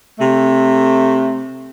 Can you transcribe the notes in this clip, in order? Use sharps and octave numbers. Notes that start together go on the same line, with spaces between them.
C3 A3